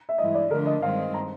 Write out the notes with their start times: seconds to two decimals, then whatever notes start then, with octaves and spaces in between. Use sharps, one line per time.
0.09 E5
0.18 G2 E3 G#3 D#5
0.35 D5
0.50 D3 F3 A3 D4 A#4
0.66 D#5
0.82 G2 D#3 G#3 C4 F5
1.14 A#5